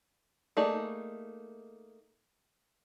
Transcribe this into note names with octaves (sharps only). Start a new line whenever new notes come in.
A3 A#3 D#4 G#4 D5